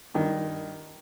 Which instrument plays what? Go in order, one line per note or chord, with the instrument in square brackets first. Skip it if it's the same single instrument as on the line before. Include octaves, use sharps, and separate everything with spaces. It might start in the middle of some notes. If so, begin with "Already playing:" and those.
[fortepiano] G2 D#3